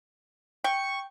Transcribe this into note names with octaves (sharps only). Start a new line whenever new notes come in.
G5 C#6